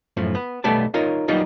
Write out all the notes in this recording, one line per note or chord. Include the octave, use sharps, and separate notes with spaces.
F#2 A2 F3
B3
B1 G3 A3 B3 D5 A5
D#4 F4 A#4 C#5
F#3 G3 A#3 B3 D#4 F4